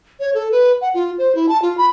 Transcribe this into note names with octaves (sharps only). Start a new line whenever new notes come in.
C#5
A4
B4
F#5
F4
C5
E4
A5
F4
B5